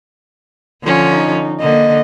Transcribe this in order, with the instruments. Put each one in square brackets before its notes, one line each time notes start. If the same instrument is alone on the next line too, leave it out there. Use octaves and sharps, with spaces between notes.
[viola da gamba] D3 F3 C#4
[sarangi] D#4
[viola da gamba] D3 A#3 [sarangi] D#5